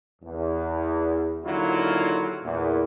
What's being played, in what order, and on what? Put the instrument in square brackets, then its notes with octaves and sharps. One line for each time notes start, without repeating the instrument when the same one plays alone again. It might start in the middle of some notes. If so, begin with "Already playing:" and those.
[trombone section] E2
D#2 D3 F#3 E4 F4
E2 A#2